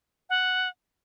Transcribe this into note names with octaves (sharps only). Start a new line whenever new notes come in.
F#5